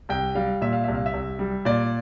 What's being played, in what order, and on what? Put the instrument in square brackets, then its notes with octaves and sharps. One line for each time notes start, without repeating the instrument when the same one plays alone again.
[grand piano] C2 G5
G3 F5
A#2 E5
F5
C2 E5
F5
E5
C2
G3
A#2 D5